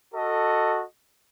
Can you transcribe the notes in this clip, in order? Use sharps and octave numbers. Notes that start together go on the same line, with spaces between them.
F#4 A4 D#5